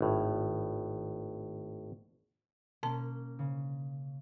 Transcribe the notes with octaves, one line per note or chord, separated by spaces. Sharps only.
G#1 A2
B2 A#3 C#4 A5
C#3